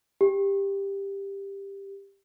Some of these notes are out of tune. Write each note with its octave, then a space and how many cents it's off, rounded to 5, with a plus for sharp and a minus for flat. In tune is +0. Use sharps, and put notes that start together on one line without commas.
G4 +10